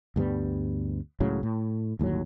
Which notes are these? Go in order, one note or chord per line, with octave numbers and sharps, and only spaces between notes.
D2 G2 G3 B3
C#2 A2 C#3 F#3
A2
G1 D#2 A2 F#3